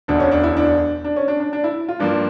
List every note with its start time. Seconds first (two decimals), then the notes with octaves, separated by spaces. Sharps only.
0.08 E1 D2 D3 D4
0.20 C#4
0.31 D4
0.43 E4
0.57 D4
1.04 D4
1.16 C#4
1.28 D4
1.40 D4
1.53 D4
1.64 E4
1.89 F4
2.00 G2 F3 A#3 D4